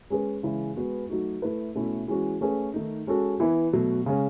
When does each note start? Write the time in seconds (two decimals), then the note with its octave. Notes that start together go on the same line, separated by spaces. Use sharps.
0.10 G#3 C#4 G#4 B4
0.43 C#3 E3 G#3 C#4 E4
0.76 G#3 B3 F#4 B4
1.09 F#3 A3 D#4 F#4
1.42 A3 E4 B4
1.75 B2 A3 C#4 E4
2.08 E3 G#3 C#4 F#4
2.41 A3 C#4 G#4 B4
2.74 D#3 A3 D#4
3.07 G#3 C#4 F#4 A4
3.40 E3 B3 E4 B4
3.73 B2 F#3 A3
4.06 C#3 G#3 C#4